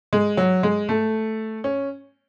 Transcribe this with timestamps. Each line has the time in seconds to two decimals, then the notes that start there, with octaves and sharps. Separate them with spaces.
0.13 G#3
0.37 F#3
0.63 G#3
0.89 A3
1.64 C#4